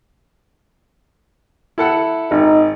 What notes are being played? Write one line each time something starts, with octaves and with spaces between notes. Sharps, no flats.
E4 A4 F#5
G#1 D#4